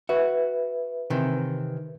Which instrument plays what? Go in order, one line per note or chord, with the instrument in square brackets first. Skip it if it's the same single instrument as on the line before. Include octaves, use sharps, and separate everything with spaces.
[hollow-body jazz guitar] F#4 [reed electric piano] B4 E5
[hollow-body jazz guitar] C3 D#3 E3